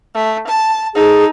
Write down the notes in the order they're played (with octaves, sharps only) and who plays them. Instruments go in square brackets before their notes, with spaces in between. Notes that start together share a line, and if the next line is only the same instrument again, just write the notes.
[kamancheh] A3
A5
[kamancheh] D#4 A4 [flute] G#4